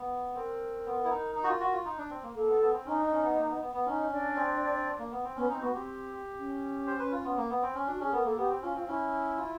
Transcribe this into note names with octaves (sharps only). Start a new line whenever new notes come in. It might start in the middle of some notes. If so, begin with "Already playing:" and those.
Already playing: B3
C4 A#4
B3
E4
D#4
D#4
F#4
F4
F#4
F4
D#4
D4
C4
A#3
A#3 A4
B3
B3
C4
C#4 D#4
D4
C#4
B3
A#3
B3
B3
B3
C#4 D#4
D4
C4
A#3
B3
C4
B3 C#4
C4 D#4
B3 F#4
C4 G4
C#4
C5
B4
F4
B3
A#3
B3
C4
C#4
D4 F#4
C#4 G#4
B3 A#4
A#3 A4
B3 G4
C4
C#4 F4
C4 F4
C#4 E4
F4